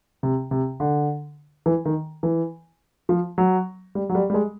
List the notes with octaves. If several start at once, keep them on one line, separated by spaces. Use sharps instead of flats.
C3
C3
D3
E3
D#3
E3
F3
F#3
G3
F#3
G3
G3
G#3